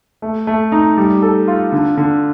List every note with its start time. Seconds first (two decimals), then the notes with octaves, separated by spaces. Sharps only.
0.22 A3
0.47 A3
0.72 D#4
0.97 G3
1.22 A4
1.48 F4
1.72 D3
1.97 D3